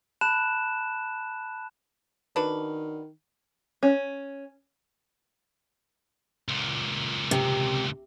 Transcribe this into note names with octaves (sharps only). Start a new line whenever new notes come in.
A5 B5 F#6 E7
D#3 D4 F#4 B4
C#4
C#2 A#2
C3